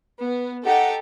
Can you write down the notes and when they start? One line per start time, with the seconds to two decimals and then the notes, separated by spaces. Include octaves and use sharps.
0.21 B3
0.65 D#4 G4 A4 F#5